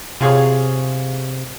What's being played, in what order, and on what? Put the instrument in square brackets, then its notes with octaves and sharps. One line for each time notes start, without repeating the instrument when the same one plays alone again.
[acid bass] C3 [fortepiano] F4 G#4 C#5